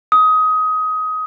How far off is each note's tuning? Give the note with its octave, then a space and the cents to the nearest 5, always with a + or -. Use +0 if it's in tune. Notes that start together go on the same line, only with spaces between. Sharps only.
D#6 +20